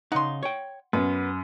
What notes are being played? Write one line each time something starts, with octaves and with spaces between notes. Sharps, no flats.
C#3 D#4 F#5 C6
C#5 G5
F#2 B3